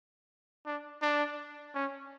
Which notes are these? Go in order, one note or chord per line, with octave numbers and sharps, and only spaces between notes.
D4
D4
C#4